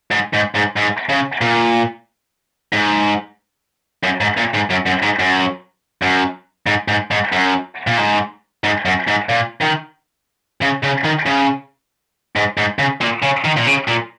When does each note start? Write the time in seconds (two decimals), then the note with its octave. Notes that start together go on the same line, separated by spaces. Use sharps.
0.11 G#2
0.33 G#2
0.55 G#2
0.76 G#2
1.09 C#3
1.41 A#2
2.73 G#2
4.04 F#2
4.21 G#2
4.37 A#2
4.54 G#2
4.70 F#2
4.86 F#2
5.02 G#2
5.19 F#2
6.02 F#2
6.67 G#2
6.88 G#2
7.11 G#2
7.32 F#2
7.87 A#2
7.98 G#2
8.64 G#2
8.85 F#2
9.07 G#2
9.29 A#2
9.62 D#3
10.61 C#3
10.83 C#3
11.04 D#3
11.26 C#3
12.36 G#2
12.57 G#2
12.79 C#3
13.01 A#2
13.23 C#3
13.45 D#3
13.58 A#2
13.67 C#3
13.88 A#2